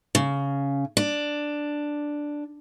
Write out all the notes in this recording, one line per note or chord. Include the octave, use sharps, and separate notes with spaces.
C#3
D4